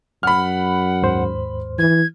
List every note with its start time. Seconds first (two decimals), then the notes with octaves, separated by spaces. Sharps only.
0.23 F#2 F#5 B5 F6
1.02 D#2 G#2 C5
1.79 E3 G#6